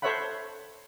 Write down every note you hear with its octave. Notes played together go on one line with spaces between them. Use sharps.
A4 C5 C#5 E5 F#5 B5